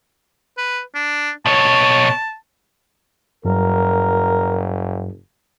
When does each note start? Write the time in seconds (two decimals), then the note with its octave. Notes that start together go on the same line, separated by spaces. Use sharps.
0.58 B4
0.95 D4
1.46 B2 C#5 A5
3.45 F#1 G2 F#3 A#4